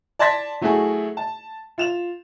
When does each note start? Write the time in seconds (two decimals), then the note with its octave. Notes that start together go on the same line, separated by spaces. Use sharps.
0.19 D5 A5 C6 G#6 A#6 B6
0.61 F#3 A3 E4 F#4 G#4
1.17 A5
1.78 F4 E7 F7